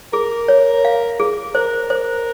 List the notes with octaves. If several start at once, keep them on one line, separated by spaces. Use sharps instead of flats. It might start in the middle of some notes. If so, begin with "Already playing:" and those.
G#4 A#4
C#5
F5
G#4
A#4 C5
C5